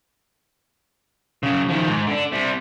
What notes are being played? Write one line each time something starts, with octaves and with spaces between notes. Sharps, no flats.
F#2 C#3
D#3 F3
G#2
D3 D4
C3 G3